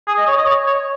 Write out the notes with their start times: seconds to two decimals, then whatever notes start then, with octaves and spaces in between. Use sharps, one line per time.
0.07 G#4
0.17 D#5
0.27 C#5
0.37 D#5
0.46 C#5
0.66 C#5